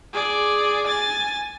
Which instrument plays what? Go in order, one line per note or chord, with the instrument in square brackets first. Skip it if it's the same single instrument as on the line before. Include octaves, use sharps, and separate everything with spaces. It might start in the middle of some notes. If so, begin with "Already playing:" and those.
[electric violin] G#4 D5
G#5 A6